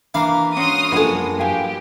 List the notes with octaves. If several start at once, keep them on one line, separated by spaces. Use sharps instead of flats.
E3 A#3 D4 F5 B5
C#4 D4 F#4 C6 D#6 F6
A#1 F#2 G#3 B3 A4 D#5
G2 E4 G4 F5 G#5